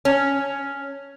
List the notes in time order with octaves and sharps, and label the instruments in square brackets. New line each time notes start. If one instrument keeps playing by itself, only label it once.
[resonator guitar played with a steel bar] C#4